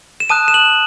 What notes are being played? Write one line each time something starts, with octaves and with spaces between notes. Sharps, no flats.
E7
A5 D#6 F#6 D#7
E7
F#7